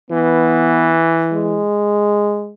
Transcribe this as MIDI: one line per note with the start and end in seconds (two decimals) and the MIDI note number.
0.11 1.60 52
0.11 0.99 59
1.33 2.53 56